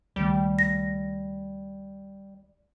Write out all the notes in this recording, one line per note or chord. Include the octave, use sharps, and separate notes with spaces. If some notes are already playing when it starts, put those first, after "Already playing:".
C#2 D#3 G3 A3
A#6